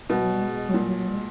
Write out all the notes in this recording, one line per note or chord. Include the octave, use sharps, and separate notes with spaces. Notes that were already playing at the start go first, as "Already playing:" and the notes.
B2 G3
F#3
G3
G#3
F#3
A#2 G3
F#3
F#3
G3
G#3